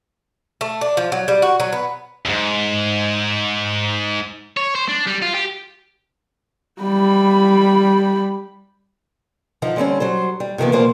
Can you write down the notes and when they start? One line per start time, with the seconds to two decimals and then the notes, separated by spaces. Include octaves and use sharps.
0.61 A3
0.81 D4
0.97 F3
1.12 F#3
1.28 G3
1.42 F#4
1.60 F#3
1.73 B3
2.25 D2 G#2
4.57 C#5
4.75 C5
4.89 D4
5.07 G3
5.22 F4
5.34 G4
6.82 G3 B5
9.62 D3 F3 D#4
9.77 D3 G3 C4 C#4
10.00 F#3 G3 C5
10.40 G3
10.58 C3 D#3 F3 A#3 B3
10.72 D2 B2 F3 A#3 C5